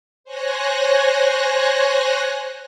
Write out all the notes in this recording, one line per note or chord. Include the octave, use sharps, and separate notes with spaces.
C5 C#5 G#5 F#6 A#6